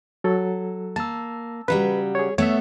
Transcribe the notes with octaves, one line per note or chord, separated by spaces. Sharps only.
F#3 A4
A#3 A5 E6
C#3 F#3 G3 B4
G#4 C#5
A3 B3 C#5 E5